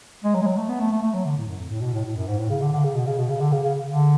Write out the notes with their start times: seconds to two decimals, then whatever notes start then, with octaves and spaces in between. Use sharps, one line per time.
0.24 G#3
0.35 F#3
0.42 G#3
0.46 F#3
0.58 A3
0.69 B3
0.80 A3
0.92 A3
1.03 A3
1.14 F#3
1.25 D3
1.37 A2
1.48 F#2
1.59 F2
1.70 A2
1.82 B2
1.94 A2
2.05 A2
2.16 F#2
2.27 G#2
2.39 A2
2.50 C#3
2.62 D3
2.72 D3
2.84 C#3
2.95 B2
3.07 C#3
3.18 B2
3.30 C#3
3.40 D3
3.52 C#3
3.64 C#3
3.86 D3